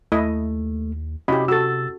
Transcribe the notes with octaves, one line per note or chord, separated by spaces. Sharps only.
D#2 A3 E4 D#5
C3 C#4 E4 F#4 G4 D#5 B5
F#4 A4 E6 A6